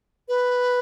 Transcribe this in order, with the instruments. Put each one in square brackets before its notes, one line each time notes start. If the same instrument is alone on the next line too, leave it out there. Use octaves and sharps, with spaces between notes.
[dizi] B4